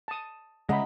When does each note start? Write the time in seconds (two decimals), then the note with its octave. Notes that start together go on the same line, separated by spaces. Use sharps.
0.08 A5 D#6
0.69 C#3 G#3 D#5 E5 F#5 A#5 B5